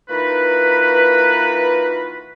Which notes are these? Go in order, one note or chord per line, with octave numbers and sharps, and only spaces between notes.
E3 A#3 D#4 F4 F#4 B4